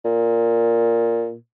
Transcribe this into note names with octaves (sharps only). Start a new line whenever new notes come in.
A#2